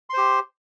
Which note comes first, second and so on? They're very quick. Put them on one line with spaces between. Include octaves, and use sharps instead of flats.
C6 C5 G4